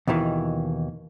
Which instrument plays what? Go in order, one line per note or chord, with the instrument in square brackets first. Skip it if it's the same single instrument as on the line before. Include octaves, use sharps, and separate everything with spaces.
[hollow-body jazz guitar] D#2 B2 D#3 E3